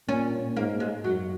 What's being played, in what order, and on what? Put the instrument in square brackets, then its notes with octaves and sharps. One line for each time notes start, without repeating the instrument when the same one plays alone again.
[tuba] A#2 [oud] C#4
[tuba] G#2 [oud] A#3
[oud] G#3
[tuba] F#2 [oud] F#3